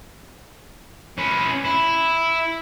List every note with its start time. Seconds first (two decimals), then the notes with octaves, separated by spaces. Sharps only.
1.18 C#4 B4
1.65 E4